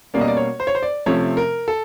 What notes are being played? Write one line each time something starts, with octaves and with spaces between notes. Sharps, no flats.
B2 G3 A#3 C#4 D5
D#5
D5
C#5
C5
C#5
C5
D5
C3 F3 A3 C#4 C#5
A#4
A4